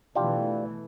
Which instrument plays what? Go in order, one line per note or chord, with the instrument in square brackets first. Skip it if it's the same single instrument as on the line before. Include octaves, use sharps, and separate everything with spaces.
[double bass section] B2 E3 A3 [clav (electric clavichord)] D4 F4 G4